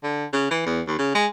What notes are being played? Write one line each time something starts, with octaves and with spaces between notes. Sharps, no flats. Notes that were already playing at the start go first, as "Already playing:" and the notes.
D3
C#3
E3
E2
D#2
C#3
G#3